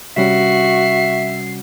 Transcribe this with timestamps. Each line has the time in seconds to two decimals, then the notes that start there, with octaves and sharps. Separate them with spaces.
0.17 C3 G3 C#4 F#4 E5 C7